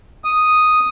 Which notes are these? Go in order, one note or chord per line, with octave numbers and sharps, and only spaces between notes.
D#6